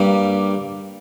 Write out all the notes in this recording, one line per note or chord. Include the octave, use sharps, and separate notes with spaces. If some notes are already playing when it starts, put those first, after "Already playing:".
Already playing: G2 G3 A#3